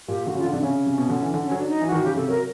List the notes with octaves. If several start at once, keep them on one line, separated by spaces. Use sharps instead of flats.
A#2 G4
D3 F#4
C#3 F4
D3
C3 D4
C#3 C#4
C3
B2
D3
E3
D3 D4
C#4
F#3
D4
D#4
E3
F#4
D#3
C#3 G4
C3 A4
F#3 A#4